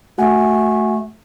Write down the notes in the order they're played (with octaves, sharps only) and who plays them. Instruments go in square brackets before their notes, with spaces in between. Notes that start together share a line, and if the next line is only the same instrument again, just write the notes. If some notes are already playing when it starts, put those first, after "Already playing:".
[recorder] A3 [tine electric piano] F#4 F#5 G#5